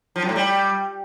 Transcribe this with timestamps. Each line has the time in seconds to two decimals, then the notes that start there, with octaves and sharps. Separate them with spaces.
0.16 F3
0.22 F#2
0.29 A2
0.36 G3